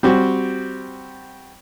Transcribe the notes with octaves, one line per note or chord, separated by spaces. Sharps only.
G3 C4 F#4